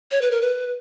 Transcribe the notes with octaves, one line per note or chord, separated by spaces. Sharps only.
C#5
B4
A#4
B4